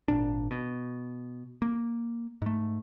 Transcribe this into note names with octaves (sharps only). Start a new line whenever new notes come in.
G#1 A#2 D4
B2
A#3
G#2 A3